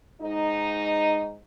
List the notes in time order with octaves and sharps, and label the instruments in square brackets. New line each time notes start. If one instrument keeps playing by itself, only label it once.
[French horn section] G#2 D#4